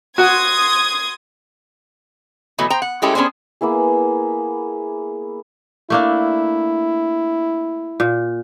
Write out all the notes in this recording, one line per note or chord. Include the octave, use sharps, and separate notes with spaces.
F#4 F#5 C6 D#6 G#6
B2 E3 F#3 A3 B3
C5 G5 A#5
F#5
G#3 A3 C#4 E4 G4 A4
B3 C#4 D4 G#4 C5
A#3 B3 E4 G#4
A3 A#3 D4 E4
A#2